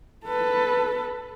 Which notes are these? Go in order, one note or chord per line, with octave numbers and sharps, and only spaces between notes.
A4 B4